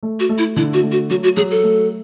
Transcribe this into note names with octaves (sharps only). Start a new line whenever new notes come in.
A3
F#4
A3
E4
D3 E4
F#4
A3
F#4
F#3 F#4
F#4
F#3 G#4
A4
A3